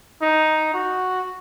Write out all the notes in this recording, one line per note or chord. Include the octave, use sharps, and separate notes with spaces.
D#4
F#4